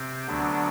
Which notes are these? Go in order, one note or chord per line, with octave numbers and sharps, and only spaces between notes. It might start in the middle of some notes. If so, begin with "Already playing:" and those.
Already playing: C3 C4
D2 D3 F#3 B3 D4